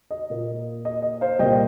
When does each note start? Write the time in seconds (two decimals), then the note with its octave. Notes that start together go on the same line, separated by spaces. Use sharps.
0.11 D#5
0.30 A#2 A#3 F4
0.85 D#5
1.02 D#5
1.21 C5 F5
1.39 C2 A#2 A#3 D#5 G5